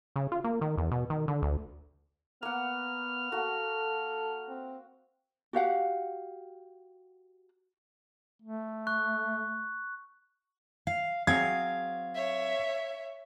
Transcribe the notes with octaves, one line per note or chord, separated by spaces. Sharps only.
C#3
F4
A#3
D#3
E2
B2
D#3
D3
D2
A#3 B3 F#5 F6
A#3 F#4 A4
C4
F#4 G4 F5 F#5
A3
C#6 F#6
F5
F#3 C4 G#4 F5 G#6
C#5 E5